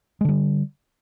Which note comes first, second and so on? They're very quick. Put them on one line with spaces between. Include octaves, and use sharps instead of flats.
G#3 D3 G3